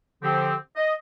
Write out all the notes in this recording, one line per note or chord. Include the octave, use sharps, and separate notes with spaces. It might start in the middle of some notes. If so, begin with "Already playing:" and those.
D3 F3 C4 G4
D#5